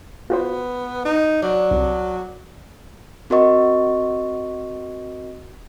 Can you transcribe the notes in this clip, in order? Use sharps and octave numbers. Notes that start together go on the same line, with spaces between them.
B3 F4 F#4 C5
D#4
F#3 D4 A#4
C2
C4 F#4 A#4 D#5 C#6